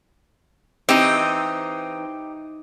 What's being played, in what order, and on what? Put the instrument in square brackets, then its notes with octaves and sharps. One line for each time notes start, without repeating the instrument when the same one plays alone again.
[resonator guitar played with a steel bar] E3 C4 [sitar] D#4 [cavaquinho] G4 D#5